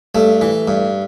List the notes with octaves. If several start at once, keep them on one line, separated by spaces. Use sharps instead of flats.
G2 A3
E3
G2